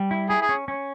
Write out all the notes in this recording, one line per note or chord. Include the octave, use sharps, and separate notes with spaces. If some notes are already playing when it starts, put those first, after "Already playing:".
Already playing: G3
E4
E4 G#4
G#4
C#4
C#4